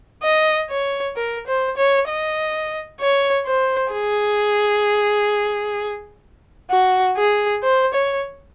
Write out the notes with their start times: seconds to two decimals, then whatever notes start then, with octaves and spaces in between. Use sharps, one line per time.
0.23 D#5
0.70 C#5
1.16 A#4
1.47 C5
1.77 C#5
2.08 D#5
3.01 C#5
3.46 C5
3.93 G#4
6.71 F#4
7.17 G#4
7.63 C5
7.94 C#5